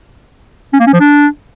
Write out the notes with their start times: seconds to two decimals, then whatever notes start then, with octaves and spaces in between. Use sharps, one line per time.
0.73 C#4
0.80 A#3
0.87 C#4
0.94 F3
1.00 D4